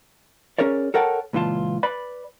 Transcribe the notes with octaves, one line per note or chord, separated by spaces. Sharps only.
C#4 G#4 A#4 C#5 D5
A4 A#4 C#5 F#5 G5 A5
C#2 A#2 E3 F4 A5
B4 D5 B5